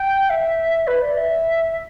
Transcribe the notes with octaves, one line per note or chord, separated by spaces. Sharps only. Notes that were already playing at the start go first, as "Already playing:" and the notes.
Already playing: G5
E5
B4
D5
E5